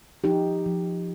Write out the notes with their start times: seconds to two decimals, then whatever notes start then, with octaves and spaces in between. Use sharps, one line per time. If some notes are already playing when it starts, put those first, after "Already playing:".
0.24 F3 D#4 G4
0.66 F3